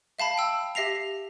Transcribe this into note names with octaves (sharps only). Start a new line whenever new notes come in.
E5 F5 A5 B5
G5 E6
G4 E5 A#6 C7 F7